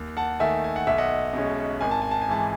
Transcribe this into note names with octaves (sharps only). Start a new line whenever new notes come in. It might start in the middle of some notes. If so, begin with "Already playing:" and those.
Already playing: D#2
F#5 A5
D#3 A3 E5 G#5
G#5
F#5
B1 E5
D#5 F#5
B2 G#3 C#4
G#1 G#5
A5
G#5
A5
G#5
G#2 E3 A5